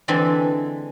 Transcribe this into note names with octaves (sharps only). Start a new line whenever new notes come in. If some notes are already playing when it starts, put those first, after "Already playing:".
D3 E3 G#3 C4 D4